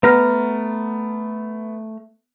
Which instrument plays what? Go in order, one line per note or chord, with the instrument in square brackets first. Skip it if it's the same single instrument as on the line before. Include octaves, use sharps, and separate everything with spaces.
[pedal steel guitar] A3 A#5 F6 [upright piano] B3